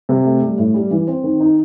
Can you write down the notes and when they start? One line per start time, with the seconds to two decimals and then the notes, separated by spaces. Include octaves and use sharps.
0.09 C3
0.25 A3
0.41 G3
0.58 A2
0.74 G3
0.91 E3
1.08 C4
1.24 D#3
1.40 D#4